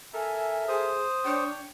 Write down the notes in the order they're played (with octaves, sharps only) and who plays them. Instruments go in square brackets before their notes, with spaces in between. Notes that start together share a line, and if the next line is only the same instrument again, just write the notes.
[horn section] A4 A#4 E5 [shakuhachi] G#5
[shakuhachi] G#4 [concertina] C5 D#6
[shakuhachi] D4 [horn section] C#5 G5